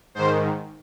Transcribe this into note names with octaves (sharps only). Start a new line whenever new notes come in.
G#2 D#3 C5